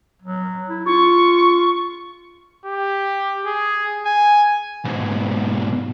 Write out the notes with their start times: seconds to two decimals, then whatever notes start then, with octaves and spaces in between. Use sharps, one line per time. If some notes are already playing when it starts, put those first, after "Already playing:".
0.22 F#3
0.69 E4
0.86 F4 C#6
2.65 G4
3.45 G#4
4.06 G#5
4.84 B1 G#2